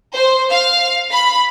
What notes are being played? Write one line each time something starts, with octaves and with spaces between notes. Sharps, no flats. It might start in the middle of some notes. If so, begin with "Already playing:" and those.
C5
F5
B5